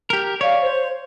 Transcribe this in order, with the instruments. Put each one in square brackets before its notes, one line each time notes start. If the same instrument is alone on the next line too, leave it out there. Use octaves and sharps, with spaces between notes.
[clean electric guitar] G4 A#4
[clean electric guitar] C#5 [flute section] D5 F5
[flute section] C5